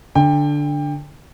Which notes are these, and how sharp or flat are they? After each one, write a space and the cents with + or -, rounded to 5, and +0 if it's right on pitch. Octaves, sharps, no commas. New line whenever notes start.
D3 +0 G5 +25